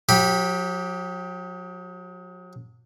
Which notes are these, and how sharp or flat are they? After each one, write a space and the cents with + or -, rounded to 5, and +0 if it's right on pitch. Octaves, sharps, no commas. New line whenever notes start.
F#3 -40 G4 +0 B5 +0